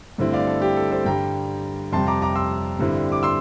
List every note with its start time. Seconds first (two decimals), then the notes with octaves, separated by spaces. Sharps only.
0.18 G2 D3 A3 C4 E4
0.33 D5 F5
0.47 A4
0.62 G4
0.77 A4
0.91 A4 C5
1.05 G2 D3 G3 G5 A#5
1.92 F2 C3 G3 A5 C6
2.07 A#5 D6
2.22 A#5 D6
2.36 C6 E6
2.79 G2 D3 G3 C4 E4
3.12 D6
3.23 C6 E6